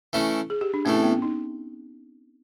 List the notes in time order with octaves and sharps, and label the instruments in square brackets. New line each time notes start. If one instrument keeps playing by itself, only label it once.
[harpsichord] E3 A3 C#4 E4
[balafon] G#4
G4
D4
[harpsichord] A2 E3 A3 [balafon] C#4
[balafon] C4
B3
C#4
D#4